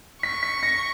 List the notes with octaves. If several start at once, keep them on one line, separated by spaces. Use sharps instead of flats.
C#6 B6
B6
A#6